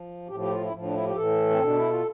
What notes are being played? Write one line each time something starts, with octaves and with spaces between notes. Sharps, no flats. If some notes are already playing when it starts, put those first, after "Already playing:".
Already playing: F3
A2 F3 G4
G4
F4
E4
A2 F3
D4
E4
G4
A2 E3 A4
C4
B2 D4
E4
F4